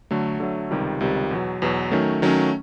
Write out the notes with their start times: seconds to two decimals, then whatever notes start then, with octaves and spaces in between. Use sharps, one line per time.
0.11 D3 F#3 A3
0.40 D3 F#3 A3
0.71 C#2 C3 D#3 G3
1.01 C#2 C3 D#3 G3
1.31 E2 B2 F#3
1.62 E2 B2 F#3
1.91 D#3 F#3 A3 C#4
2.22 D#3 F#3 A3 C#4